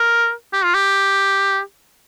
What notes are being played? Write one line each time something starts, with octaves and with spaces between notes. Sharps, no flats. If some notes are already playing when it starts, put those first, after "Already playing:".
Already playing: A#4
G4
F4
G4